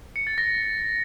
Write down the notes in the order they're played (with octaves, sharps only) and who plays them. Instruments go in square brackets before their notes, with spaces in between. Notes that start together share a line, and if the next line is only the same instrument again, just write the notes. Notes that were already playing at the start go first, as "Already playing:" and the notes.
[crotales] C#7
A6
A#6